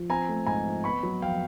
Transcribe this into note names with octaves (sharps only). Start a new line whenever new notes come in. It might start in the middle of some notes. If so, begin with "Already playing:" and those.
Already playing: F3
C4 G#5 A#5
A3
G#2 G#5 A#5
F3
B3 B5 C#6
F#3
F2 F5 G5